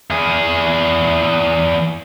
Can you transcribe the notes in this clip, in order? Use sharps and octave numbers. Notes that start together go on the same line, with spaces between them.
E2 G#4